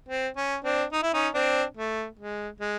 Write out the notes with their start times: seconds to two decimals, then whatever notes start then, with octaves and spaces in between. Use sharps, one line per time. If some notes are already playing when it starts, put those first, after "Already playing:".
0.08 C4
0.37 C#4
0.64 C4 D4
0.92 D#4
1.03 E4
1.13 C#4 D#4
1.34 C4 D4
1.77 A3
2.19 G#3
2.61 G#3